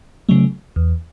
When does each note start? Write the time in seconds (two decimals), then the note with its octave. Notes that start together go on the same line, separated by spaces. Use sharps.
0.29 C#3 F#3 A3
0.76 E2